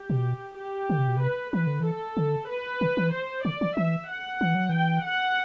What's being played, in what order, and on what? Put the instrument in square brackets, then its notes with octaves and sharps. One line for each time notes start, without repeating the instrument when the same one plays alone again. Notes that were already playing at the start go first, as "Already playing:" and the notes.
Already playing: [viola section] G4
[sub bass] B2
[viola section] G4
[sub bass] D3
C3
B2
[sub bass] C3 [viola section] B4
[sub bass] E3 [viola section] B4
[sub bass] D3
E3
[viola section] A4
[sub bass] D3
[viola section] B4
[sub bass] D3
E3
[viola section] C5
[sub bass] D3 [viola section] D5
[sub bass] E3
[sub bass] E3 [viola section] E5
[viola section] F#5
[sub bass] E3
F#3
[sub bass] E3 [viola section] G5
[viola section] F#5